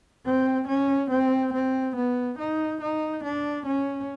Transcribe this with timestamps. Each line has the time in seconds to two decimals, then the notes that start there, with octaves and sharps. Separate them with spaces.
0.25 C4
0.68 C#4
1.10 C4
1.53 C4
1.95 B3
2.39 D#4
2.81 D#4
3.24 D4
3.66 C#4